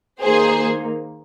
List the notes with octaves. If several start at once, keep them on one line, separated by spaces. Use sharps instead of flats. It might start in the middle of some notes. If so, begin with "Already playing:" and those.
D#3 A#3 D#4 G#4 C5